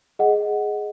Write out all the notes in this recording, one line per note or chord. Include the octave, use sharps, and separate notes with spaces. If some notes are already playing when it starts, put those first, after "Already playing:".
G#4 D#5 F#5